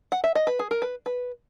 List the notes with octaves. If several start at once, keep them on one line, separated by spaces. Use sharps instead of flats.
F#5
E5
D#5
B4
G#4
A#4
B4
B4